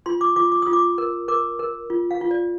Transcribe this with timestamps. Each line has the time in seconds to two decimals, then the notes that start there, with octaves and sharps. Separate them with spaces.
0.06 F4 C6
0.21 D6
0.36 F4 D6
0.52 D6
0.62 F4 D#6
0.73 D6
0.98 A#4
1.28 A#4 D6
1.59 A#4
1.90 F4
2.11 F5
2.21 F4
2.31 D5